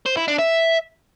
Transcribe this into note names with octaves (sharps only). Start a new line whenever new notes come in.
C5
E4
D4
E5